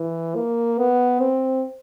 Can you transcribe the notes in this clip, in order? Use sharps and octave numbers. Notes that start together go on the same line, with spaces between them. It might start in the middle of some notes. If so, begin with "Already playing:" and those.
Already playing: E3
A#3
B3
C4